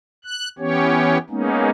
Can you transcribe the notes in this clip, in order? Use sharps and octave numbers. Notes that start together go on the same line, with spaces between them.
F#6
E3 B3 C#4 G4 C#5
G#3 A#3 B3 C#4 D#4